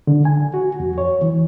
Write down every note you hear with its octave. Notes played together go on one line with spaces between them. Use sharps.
D3
G#5
F#4
F2
C#5
E3